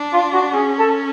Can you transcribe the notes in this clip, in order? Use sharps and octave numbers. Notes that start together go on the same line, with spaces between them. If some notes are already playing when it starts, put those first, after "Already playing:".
Already playing: D4
F4
F#4
C#4 G#4
A4